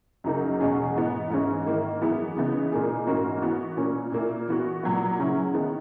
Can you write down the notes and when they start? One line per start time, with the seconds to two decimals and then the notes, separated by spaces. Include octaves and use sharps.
0.24 F#2 C#3 F#3 A#3 D#4
0.60 E2 B2 G#3 C#4 G#4
0.95 G#2 E3 B3 D#4
1.30 G#2 E3 G#3 C#4 E4
1.65 G#2 D#3 A#3 E4
2.01 F#2 E3 G#3 B3 E4
2.36 C#3 E3 B3 D#4
2.71 A#2 A#3 D#4 G#4
3.06 G#2 E3 A#3 C#4 F#4
3.41 E3 B3 F#4
3.77 A#2 A#3 C#4
4.12 A#2 A#3 E4
4.48 E3 B3 F#4
4.83 A#2 F#3 B3
5.18 C#3 F#3 C#4 E4
5.54 D#3 G#3 B3